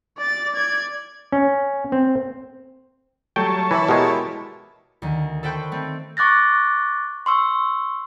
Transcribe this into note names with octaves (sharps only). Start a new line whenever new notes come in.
D5 A6
D5 G#6
C#4
C4
F#3 G3 A3 C#5 G5 A5
E3 E4 B4 B5
B2 G#3 G4 A#4 D#5
D2 D#3
A4 B4 C5 G5 B5 C#6
A3 C4
C#6 D6 F#6 A6 A#6
C6 C#6 E6